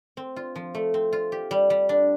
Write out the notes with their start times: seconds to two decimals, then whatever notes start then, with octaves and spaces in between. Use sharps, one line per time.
0.17 C4
0.36 F4
0.56 F3
0.75 A3
0.94 C4
1.13 F4
1.32 G4
1.51 G3
1.70 G3
1.89 D4